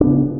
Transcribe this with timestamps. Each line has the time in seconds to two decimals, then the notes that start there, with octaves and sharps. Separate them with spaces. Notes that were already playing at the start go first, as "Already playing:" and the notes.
0.01 D4
0.04 B3
0.07 C#3